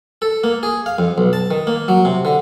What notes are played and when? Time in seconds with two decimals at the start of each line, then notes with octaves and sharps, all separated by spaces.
0.22 A4
0.44 A#3
0.63 G#4
0.86 F5
0.98 F2
1.18 B1
1.33 A5
1.51 D#3
1.67 A#3
1.88 F#3
2.05 C3
2.25 D3